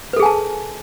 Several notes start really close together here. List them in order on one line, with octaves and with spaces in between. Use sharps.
B4 A4 G#4 G#5 A5